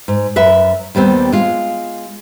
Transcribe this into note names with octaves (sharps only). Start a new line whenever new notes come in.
G#2
F#2 B4 E5
D#2 G3 B3 C4
G#3 F4